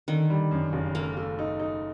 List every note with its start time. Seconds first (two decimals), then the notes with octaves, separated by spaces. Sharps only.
0.08 D3 D#3
0.30 G3
0.51 F#2
0.73 F#1
0.95 A3 A#3
1.17 A3
1.39 D#4
1.60 D#4